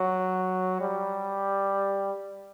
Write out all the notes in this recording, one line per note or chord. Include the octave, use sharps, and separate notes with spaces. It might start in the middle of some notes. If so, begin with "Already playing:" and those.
Already playing: F#3
G3